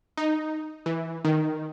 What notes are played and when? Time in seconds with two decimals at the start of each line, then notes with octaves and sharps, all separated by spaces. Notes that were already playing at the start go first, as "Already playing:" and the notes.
0.17 D#4
0.86 E3
1.25 D#3